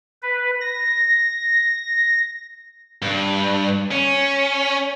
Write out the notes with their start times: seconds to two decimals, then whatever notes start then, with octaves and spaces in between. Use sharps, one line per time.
0.22 B4
0.61 A#6
3.02 G2
3.91 C#4